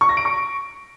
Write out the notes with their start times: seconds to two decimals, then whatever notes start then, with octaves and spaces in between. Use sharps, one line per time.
0.01 C#6
0.09 A#6
0.17 D7
0.25 C#6